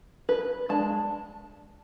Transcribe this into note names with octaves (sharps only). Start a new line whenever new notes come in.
B4
G#3 D4 A5